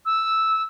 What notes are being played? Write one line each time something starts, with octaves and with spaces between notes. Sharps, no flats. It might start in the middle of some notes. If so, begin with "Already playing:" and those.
E6